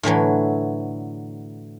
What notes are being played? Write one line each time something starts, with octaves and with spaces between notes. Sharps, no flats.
A2 D3 E3 F#3